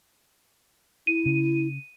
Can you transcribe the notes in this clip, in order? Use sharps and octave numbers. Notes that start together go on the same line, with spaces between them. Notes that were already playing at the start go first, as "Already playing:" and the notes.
E4 D#7
C#3